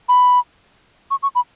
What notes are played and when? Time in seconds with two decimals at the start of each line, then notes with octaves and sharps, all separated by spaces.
0.09 B5
1.11 C#6
1.23 C#6
1.35 B5